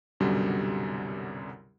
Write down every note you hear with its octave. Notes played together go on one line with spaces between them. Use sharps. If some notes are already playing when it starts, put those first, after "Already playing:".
C2 F#2 B2 D3 G3